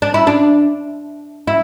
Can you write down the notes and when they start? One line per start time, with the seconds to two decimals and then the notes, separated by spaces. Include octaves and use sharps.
0.02 D4
0.14 E4
0.27 D4
1.47 E4